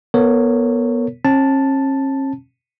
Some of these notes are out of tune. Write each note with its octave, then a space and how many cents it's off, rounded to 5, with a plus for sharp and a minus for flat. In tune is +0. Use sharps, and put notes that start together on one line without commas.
B3 -25 A#4 -40 C#5 +0
C#4 -40 A5 +0